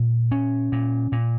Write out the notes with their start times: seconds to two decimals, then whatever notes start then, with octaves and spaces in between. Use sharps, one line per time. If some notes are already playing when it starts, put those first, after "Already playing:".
Already playing: A#2
0.31 C#4
0.72 A#2
1.12 A#2